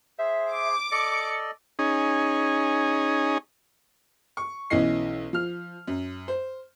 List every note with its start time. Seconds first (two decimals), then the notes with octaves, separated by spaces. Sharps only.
0.18 G#4 C5 E5
0.54 D6
0.91 A4 D5 D#5 C#7
1.79 C#4 D#4 G#4
4.37 C#6
4.70 B1 E3 C#4 D#5 C7
5.33 F3 F6
5.88 F#2
6.28 C5